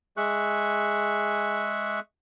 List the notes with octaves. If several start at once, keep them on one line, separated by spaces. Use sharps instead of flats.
G#3 G#4 E5 C#6 F#6